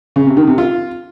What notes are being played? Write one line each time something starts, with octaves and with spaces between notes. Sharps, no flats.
C#3
C3
D#3
C3
F4